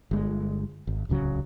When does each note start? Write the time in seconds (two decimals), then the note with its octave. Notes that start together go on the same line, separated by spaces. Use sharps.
0.11 G1 G#3
0.87 G#1
1.09 D1 C2 C#3 F#3